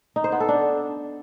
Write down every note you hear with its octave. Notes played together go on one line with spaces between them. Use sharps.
D#4
C5
B3
A4
D4